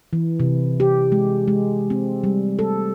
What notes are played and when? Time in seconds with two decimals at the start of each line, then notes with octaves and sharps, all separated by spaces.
0.13 E3
0.40 C3
0.80 G4
1.12 G#3
1.48 G#3
1.90 C4
2.24 G3
2.59 A4